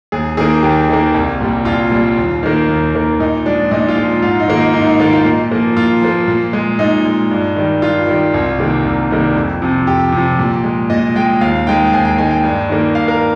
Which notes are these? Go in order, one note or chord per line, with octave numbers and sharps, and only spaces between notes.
D#2 G#4
D#3 A#3 G#4
D#2 G4
D#3 A#3
C2
A#2 G3
C2 F4
A#2 G3
D#2
D#3 A#3
D#2
D#3 A#3
A#2 D#4
F3 G#3 D4
A#2 D#4
F4
F3 G#3
G#2 F4
D#4
D#3 A#3
D#4
G#2 D#4
D#4
D#3 A#3 F4
F4
A#2
F3 A#3
A#2 F4
F3 A#3
A#2
G#3
A#2 D#4
G#3
G2
D#3 G3
G2 F4
D#3 G3
C2
C3 D#3 G3 A#3
C2
C3 D#3 G3 A#3
F2
C3 F3
F2 G4
C3 F3
A#2
G#3
A#2 D#5
G#3 G5
D#2 F5
D#3 G#3 G5
G5
D#2 G#5
G5
D#3 G#3 G#5
G5
G2
D#3 A#3
G2 F5
A#4